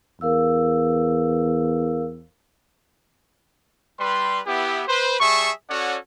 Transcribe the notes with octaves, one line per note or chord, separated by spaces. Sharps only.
E2 A#4 F5 E6
G3 B4 C6
B3 E4 G4
B4 C5
G3 G#4 E5 A5 C#6
C#4 F#4 A4 C#5 D5 F#5